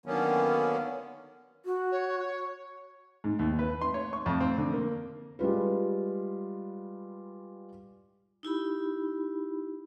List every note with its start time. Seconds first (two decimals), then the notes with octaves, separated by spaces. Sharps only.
0.06 D3 D#3 F#3 A#3 B3 C#4
1.65 F#4
1.92 C#5
3.24 G#2
3.39 D#2
3.59 B4
3.81 C6
3.94 C#5
4.13 C#6
4.26 F2
4.40 C4
4.58 D3
4.73 A#3
5.39 G3 G#3 F4 B4
8.43 D#4 E4 G4 B5